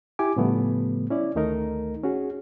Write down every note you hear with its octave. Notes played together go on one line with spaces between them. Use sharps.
E4 G4 G#5 D6
A2 C#3 F3 G3 A3 B3
C#4 E4 D5
D2 D#3 A3 D#4 A#4
C#4 F#4 G#4